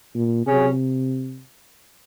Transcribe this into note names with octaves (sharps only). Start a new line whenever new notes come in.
A#2
C3 F#3 C#4 G#4